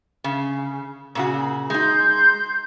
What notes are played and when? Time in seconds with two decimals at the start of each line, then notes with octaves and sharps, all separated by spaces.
0.24 C#3
1.15 A#2 C#3 F#4
1.70 G#3 D#4 C6 G6